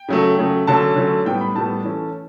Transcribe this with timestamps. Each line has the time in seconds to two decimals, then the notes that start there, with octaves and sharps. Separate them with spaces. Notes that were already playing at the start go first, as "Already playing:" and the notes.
Already playing: G5
0.08 C#3 F#3 A3
0.39 C#3 F#3 A3
0.67 D3 F#3 A3 C#4 A5
0.96 D3 F#3 A3 C#4
1.25 A2 G3 B3 G5
1.41 B5
1.55 A2 G3 B3 A5
1.84 E3 A3 C#4